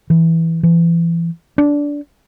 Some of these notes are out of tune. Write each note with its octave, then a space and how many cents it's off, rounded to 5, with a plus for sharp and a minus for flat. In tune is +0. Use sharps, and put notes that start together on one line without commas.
E3 -5
E3 +35
D4 -15